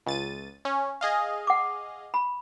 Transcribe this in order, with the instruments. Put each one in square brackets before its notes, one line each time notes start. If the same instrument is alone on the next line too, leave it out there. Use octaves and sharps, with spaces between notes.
[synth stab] C#2 A6 D#7
C#4
G#4 D#5 F5
[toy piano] F#5 D6
B5